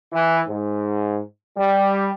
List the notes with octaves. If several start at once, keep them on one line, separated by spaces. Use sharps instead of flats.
E3
G#2
G3